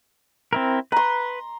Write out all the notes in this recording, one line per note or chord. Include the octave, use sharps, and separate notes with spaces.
C4 E4 A#4
B4 A#5 C6